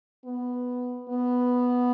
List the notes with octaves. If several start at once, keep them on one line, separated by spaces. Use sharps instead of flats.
B3
B3